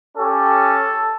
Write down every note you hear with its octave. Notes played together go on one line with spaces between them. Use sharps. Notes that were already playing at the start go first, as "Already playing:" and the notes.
C#4 G4 A4